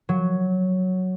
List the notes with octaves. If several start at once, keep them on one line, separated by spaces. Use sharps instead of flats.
F#3